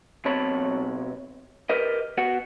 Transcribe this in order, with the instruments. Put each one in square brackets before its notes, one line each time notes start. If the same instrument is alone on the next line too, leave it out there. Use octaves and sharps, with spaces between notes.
[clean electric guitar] B1 B2 C4 C#5 A5 B5
G4 A#4 B4 D#5
B3 F#4 F#5